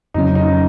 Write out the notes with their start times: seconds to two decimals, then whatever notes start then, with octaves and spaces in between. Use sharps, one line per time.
0.14 F2 C#3 F#3 C#4 D#4
0.35 D#4